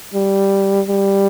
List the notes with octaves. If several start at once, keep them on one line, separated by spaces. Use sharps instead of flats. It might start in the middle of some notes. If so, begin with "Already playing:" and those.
G3
G3